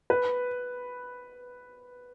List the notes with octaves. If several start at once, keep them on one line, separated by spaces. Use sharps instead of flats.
B4